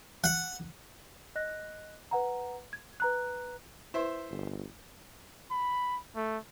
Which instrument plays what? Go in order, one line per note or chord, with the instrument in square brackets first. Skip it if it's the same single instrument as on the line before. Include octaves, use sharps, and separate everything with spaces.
[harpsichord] F#5
[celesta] D#5 F#6 A#6
B4 F#5 A#5
G#6
B4 A#5 F#6
[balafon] E4 B4 [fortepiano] C5 E5
[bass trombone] G1
[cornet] B5
A3